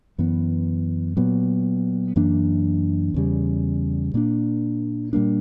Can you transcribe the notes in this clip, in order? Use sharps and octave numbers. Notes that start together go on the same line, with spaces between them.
F#2 E3 B3
A#2 F#3 B3
F#2 E3 A#3 D4
E2 C#3 G3
A#2 A#3 D4
A#2 G3 A#3 D4